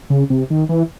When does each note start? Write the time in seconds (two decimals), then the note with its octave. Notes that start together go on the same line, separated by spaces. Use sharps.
0.10 C#3
0.30 C3
0.50 D#3
0.69 E3